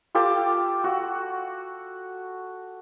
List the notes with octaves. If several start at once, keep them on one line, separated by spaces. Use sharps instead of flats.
F4 G4 A4 D6
F#4